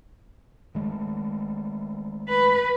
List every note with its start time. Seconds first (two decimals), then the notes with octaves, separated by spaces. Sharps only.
0.75 D#3 G#3 A3
2.28 B4